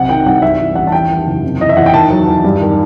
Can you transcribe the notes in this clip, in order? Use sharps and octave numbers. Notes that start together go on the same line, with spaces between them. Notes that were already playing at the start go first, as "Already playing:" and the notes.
Already playing: B1 C3 F#5
D#3 G5
C2 F#5
G2 E5
E3
A1 F#5
A5
E2 G5
D#3
F#1
C3
E3 D#5
E5
E2 F#5
G5
D#3 A5
F#3
E2
G2
D#3